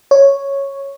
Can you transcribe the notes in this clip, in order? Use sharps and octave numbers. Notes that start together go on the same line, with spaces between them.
C#5